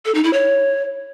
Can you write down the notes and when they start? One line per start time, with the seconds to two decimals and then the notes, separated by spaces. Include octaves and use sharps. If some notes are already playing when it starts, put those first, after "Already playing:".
0.05 A4
0.15 D#4
0.24 E4
0.33 C#5